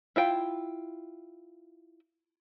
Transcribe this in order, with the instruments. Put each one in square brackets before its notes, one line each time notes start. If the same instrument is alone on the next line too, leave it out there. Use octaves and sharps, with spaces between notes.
[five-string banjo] E4 F4 G5